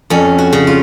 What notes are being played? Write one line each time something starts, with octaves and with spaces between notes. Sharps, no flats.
F2 C#4
F#4
C#3
F4